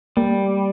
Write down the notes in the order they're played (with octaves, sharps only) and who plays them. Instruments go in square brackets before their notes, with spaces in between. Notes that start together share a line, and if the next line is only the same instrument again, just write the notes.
[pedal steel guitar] G3 [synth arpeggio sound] A#3